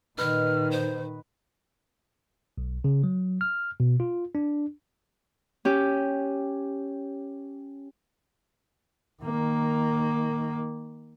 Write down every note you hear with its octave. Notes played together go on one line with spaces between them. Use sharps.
A#2 D#3 B4 D#5 F6
C5
B1
C#3
F#3
F6
B2
F4
D4
C#4 G4
D#3 A#3